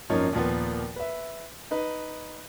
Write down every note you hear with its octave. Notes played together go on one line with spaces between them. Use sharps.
G#1 F#2 F3 A#3 D#4 C#5
D#2 A#2 F3 A#3 B3
B4 E5
D#4 B4